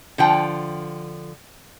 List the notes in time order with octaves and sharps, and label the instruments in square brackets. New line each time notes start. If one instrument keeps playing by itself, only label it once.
[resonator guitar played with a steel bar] D3 F3 G5